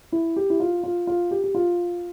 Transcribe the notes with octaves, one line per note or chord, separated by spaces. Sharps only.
E4
G4
E4
F4
F4
F4
G4
G4
F4